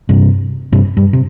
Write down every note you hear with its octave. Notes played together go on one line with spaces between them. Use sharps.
G2 C3
G2 C3
G2
C3